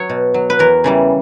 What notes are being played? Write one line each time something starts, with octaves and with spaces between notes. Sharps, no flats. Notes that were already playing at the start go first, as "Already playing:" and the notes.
Already playing: F#3 C#5
B2
F#3
B4
E2 A#4
C#3 E3 G3